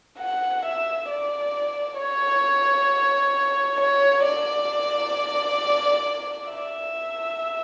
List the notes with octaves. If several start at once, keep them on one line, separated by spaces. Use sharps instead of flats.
F#5
E5
D5
C#5
C#5
D5
E5